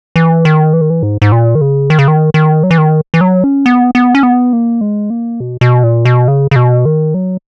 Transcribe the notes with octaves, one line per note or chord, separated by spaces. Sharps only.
E3
D#3
E3
D#3
E3
G#2
G#2
A#2
D#3
C#3
D#3
C#3
D#3
D#3
F#3
E3
D#3
E3
F#3
C#4
B3
B3
C#4
B3
A#3
G#3
A#3
B2
B2
A#2
B2
C#3
C#3
B2
D#3
F#3